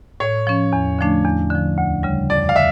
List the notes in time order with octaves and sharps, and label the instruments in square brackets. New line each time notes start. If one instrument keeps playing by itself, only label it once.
[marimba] A2 [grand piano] C#5
[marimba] F3 C#4
E2
D3 F3 A3 D4
E2
D3 F3
D2
C#3 G3
[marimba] F2 [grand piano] D5
[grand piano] F5
[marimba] D3 [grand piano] E5